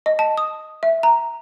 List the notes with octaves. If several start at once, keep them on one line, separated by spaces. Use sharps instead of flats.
D#5
A5
D#6
E5
A#5